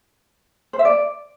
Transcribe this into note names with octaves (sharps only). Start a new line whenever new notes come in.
C5
E5
D5